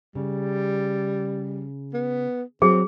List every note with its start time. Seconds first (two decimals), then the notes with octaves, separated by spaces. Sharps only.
0.15 C#3 G3
1.94 B3
2.62 F#3 C4 G#4